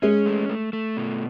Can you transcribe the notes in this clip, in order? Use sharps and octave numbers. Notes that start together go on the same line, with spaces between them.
G#3 C#4
A3
A3
A3
B2